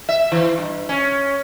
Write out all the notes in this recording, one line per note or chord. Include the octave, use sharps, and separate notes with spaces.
E5
E3
G2
C#4